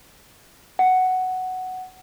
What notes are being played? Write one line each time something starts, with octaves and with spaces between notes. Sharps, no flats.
F#5